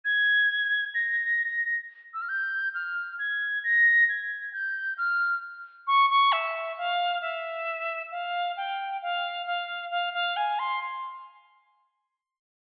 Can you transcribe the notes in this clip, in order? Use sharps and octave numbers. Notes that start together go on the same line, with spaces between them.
G#6
A#6
E6
F6
G6
F6
G#6
A#6
G#6
G6
F6
C#6
C#6
E5
F5
E5
F5
G5
F5
F5
F5
F5
G#5
C6